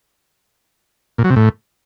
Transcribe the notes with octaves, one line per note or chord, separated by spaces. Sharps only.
A#2
F#3
C3
A2